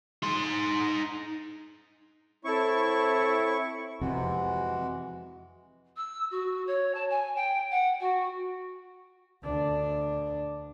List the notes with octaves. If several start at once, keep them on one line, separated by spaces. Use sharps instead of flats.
D#4 C6
C4 E4 A4 C#5 C#6
F2 C3 E3 G#3 F#4
E6
F#4
C#5
A5
G#5
G5
F#5
F#4
D2 D4